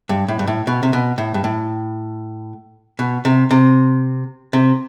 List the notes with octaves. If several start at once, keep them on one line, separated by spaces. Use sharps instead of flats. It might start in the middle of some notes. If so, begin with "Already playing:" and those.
G2
A2
G2
A2
B2
C3
B2
A2
G2
A2
B2
C3
C3
C3